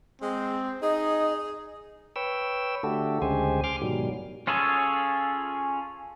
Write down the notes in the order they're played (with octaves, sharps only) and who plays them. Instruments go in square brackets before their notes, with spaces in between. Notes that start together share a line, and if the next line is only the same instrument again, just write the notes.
[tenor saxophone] G#3 [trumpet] C4
[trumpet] D#4 [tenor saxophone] G#4 [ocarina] D#5
[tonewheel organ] B4 C#5 G5 E6
D3 A3 F#4 G4 A4
D2 C#3 G#3 G4 C5 G#5
G#5 C6 D6 F6
G#2 B2 D#3 F#3 G3
[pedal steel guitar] C#4 F4 G#4 A4 C#5